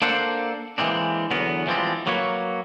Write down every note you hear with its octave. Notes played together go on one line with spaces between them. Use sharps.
A#3 D4 A4 C5 F#5
E3 G#3 A#3 C4 D4
E2 D3 F#3 B3 A#4
E3 F3 G3 G#3 C4
F#3 A#3 B4 C#5